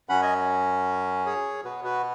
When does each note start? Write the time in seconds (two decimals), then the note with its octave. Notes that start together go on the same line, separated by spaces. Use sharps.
0.09 F#2 F#3 C#4 F#5 B5
0.22 D#5 G#5
1.26 G#4 C#5
1.64 B2 B3 F#4 B4
1.84 F#4 B4